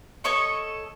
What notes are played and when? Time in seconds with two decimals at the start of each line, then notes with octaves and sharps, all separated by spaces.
0.24 A4 C#5 D#5 C#6